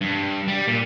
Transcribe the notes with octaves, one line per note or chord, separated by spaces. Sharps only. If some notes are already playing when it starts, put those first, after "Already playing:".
G2
G3
A#2